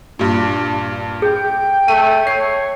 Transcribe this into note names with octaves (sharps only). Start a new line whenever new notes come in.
G2 A#2 D4
G#4 G5 G6
A3 D#7
C#5 C7